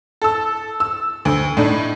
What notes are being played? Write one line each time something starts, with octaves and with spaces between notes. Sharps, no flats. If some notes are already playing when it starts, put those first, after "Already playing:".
A4 E6
E6
D2
A2 D4 D#4